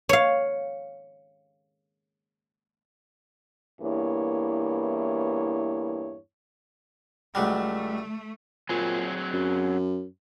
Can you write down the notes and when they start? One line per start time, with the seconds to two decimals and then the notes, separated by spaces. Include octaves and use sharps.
0.09 C#5 F5
3.82 E2 G2 A#3 E4 C#5
7.35 C#2 F#3 G3 A3
8.69 A#2 F#3 C4 G#4
9.34 F#2